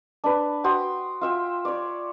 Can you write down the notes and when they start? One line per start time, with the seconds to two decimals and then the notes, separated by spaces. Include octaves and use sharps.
0.24 D4 B4
0.64 F#4 G5 C6 D#6
1.21 F4 E5 G5
1.65 C#5 D5